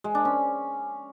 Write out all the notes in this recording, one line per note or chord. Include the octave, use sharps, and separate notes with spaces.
G#3
D4
C#4